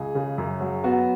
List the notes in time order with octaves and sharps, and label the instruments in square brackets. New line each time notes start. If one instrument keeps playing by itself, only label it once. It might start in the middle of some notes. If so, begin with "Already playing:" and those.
Already playing: [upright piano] C#2 G#4
C#3
F#2
F#3
B3 F#4